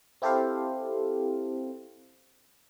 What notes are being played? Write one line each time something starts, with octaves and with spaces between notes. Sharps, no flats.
C4 E4 G4 A4 C5 F5